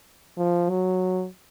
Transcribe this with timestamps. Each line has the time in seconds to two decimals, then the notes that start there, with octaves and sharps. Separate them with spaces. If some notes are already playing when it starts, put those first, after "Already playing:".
0.37 F3
0.69 F#3